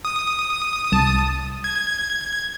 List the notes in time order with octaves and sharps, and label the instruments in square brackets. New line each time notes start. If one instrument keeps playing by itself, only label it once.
[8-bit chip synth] D#6
[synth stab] C2 A5
[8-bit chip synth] G#6